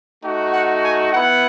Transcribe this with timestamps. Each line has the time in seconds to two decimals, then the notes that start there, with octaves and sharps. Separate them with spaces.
0.22 A3 D#4 F#4
0.53 F#5
0.82 G#5
1.12 B3 E4 F#5